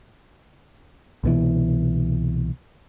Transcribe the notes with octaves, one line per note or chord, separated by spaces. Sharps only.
C2 B2 E3